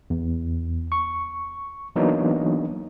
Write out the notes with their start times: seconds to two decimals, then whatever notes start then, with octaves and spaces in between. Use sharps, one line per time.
0.10 E2
0.92 C#6
1.96 E3 F#3 A#3 B3 D4 D#4